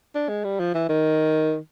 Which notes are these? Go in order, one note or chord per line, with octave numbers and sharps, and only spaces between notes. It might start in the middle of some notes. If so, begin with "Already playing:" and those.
D4
G#3
G3
F3
E3
D#3